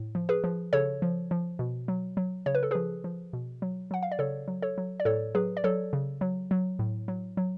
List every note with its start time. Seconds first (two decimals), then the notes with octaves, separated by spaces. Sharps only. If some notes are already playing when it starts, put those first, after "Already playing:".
Already playing: A2
0.15 F3
0.29 G#4 B4
0.44 F3
0.73 C#3 A4 C#5
1.02 F3
1.31 F3
1.59 B2
1.88 F#3
2.17 F#3
2.46 C#3 C#5
2.55 B4
2.63 A4
2.71 F3 G#4 B4
3.04 F3
3.33 B2
3.62 F#3
3.91 F#3 F#5
4.03 F5
4.12 D5
4.19 C#3 A4 C#5
4.48 F#3
4.62 A4 C#5
4.78 F#3
5.00 D5
5.05 A2 A4 C#5
5.35 F#3 G#4 B4
5.57 D5
5.64 F#3 A4 C#5
5.93 C#3
6.21 F#3
6.51 F#3
6.79 A2
7.08 F#3
7.37 F#3